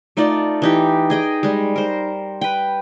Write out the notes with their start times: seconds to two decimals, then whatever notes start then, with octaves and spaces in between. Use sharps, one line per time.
0.17 A3 D#4 F4 D5
0.62 E3 D#4 G4
1.10 G#4 D#5 G5
1.43 G3 G#3
1.76 A#4 C5
2.41 B4 G5